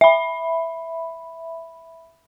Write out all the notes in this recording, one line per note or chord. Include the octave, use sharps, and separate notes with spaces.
E5 B5